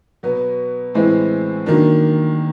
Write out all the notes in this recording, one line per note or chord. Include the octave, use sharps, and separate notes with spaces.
B2 F#3 B3
A2 E3 G#3 C4 E4
D#3 F#3 A#3 D4